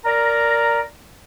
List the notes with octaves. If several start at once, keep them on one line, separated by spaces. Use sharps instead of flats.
A#4 D5 A#5